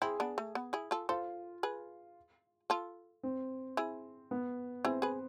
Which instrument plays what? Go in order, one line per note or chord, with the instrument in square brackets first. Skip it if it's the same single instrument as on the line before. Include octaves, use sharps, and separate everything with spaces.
[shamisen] C4 E4 [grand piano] G#4
[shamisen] B3 D4
A3
B3
E4 G#4
F4 A4
[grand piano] F4 [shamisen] A4 C5
[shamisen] G#4 B4
F4 A4
[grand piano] C4
[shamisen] E4 G#4
[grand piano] B3
[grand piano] C4 [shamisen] E4 G#4
[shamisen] G#4 B4